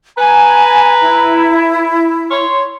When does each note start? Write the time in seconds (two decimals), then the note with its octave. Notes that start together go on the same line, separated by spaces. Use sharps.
0.18 B4 G#5 A#5
1.01 E4
2.30 C#5 C6